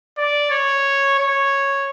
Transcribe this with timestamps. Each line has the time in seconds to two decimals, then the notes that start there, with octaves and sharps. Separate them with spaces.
0.18 D5
0.51 C#5
1.19 C#5